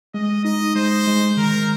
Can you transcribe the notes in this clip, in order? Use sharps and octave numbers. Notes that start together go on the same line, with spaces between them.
G#3 D#5
D#4 D#5
G#3 C5
G#3
D#3 A#4